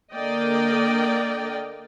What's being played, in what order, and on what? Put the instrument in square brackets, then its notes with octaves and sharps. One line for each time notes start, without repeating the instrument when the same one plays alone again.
[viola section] D3 A#3 A#4 D5 D#5 G5